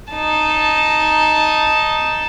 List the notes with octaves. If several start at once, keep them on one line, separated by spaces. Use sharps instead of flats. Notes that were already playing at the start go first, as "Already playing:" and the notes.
D#4 A5